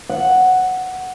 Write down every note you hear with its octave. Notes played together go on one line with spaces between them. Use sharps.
F#5